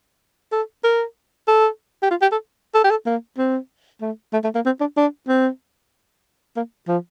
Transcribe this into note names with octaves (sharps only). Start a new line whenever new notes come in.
A4
A#4
A4
G4
F4
G4
A4
A4
G4
A4
A#3
C4
A3
A3
A3
A#3
C4
D4
D4
C4
A#3
F3